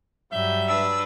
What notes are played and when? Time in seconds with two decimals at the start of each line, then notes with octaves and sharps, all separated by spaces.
0.32 G2 F#3 G3 E5 G6
0.68 D4 B4 E6